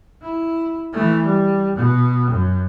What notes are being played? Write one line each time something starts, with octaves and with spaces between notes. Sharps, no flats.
E4
E3 A3
G3
B2
F#2